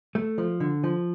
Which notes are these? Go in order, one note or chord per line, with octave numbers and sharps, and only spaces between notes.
A3
F3
D3
F3